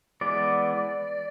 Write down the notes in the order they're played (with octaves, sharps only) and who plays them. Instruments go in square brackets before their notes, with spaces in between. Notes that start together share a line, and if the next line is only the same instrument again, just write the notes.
[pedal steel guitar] E3 G#3 B3 D5